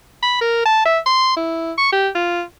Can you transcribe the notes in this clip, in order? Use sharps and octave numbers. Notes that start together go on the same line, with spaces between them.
B5
A#4
A5
E5
C6
E4
C#6
G4
F4